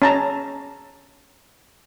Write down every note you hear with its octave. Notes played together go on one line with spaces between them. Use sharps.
C#4 A5 A#5